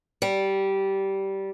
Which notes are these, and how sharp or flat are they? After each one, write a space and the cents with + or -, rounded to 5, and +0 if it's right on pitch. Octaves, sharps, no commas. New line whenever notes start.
G3 -15